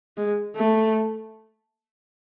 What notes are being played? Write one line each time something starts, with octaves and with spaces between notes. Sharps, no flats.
G#3
A3